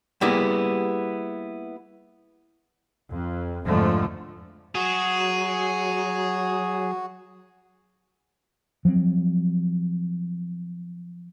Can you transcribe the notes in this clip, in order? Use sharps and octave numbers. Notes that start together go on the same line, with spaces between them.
G3 A#3 B3 E4 G4 G#4
F2
F2 G#2 D3 F3 A3
F#3 F#4 G#4
F3 F#3 A3 C4